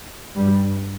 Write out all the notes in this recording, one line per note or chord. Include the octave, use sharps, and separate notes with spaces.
G2 G3